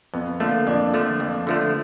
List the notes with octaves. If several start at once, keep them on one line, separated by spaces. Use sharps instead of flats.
F2 B3
D3 F3 A3 A#3
F2 D4
D3 F3 A3
F2
D3 F3 A3